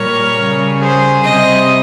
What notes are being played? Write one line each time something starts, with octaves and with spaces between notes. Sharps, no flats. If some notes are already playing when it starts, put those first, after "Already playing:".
Already playing: A#2 G3 A#4 C#5
C#3 G3
G#4 C5
C3 G3 C5 D#5